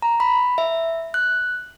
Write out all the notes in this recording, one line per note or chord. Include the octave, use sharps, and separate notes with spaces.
A#5
B5
E5
F#6